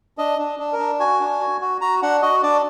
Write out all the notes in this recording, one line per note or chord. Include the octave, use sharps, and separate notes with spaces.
D4 D#5
D4
D4
A#4
D4
F#4 G#5
D4
F#4
F#4
F#4 A#5
D4 F#5
F#4 D#5
D4 D5